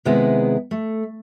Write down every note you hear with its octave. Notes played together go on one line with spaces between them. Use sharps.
C3 D#3 G#3 B3 E4 G#4
A3